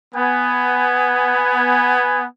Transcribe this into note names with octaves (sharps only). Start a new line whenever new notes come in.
B3 G#5